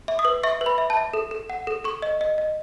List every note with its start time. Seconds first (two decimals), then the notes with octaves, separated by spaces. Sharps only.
0.08 E5
0.19 D#6
0.25 B4
0.43 E5 C#6
0.61 B4
0.66 B5
0.78 E5
0.90 A5
0.97 E5
1.14 A4
1.31 A4
1.50 F#5
1.67 A4
1.84 A4 C#6
2.02 D#5
2.21 D#5
2.38 D#5